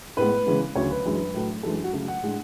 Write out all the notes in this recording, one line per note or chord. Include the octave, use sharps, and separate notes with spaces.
A2 G#3 B3 B4
C#3 E3 G#3 B3
D2 C#3 F#3 C#5
B4
F#2 E3 G#3 D4
A2 F#3 A3
F#2 E3 G#3 D4 A4
F#4
C#3 F#3 A3
F#5
A2 G#3 D4